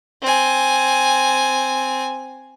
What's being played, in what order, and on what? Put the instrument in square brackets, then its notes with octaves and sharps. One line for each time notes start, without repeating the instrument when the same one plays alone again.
[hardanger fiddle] C4 G#5